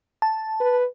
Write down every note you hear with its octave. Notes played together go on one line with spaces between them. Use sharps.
A5
B4